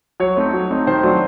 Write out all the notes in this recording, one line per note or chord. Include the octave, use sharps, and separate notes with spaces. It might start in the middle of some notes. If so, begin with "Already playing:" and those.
F#3 C#5
A3 C4 D#4
F#3
A3 C4 D#4
D#3 C5
F#3 A3 D4 F4